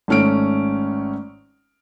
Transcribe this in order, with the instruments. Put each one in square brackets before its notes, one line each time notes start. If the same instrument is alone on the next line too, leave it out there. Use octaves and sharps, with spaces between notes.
[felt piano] G#1 A3 C#4 F6 D7